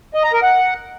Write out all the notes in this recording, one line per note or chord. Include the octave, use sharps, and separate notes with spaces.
D#5
A#5
A#4
F#5